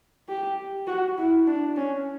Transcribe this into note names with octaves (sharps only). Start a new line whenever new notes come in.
G4
F#4
E4
D4
C#4